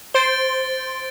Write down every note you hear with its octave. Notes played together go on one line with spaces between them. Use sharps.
C5 A6 D7 G7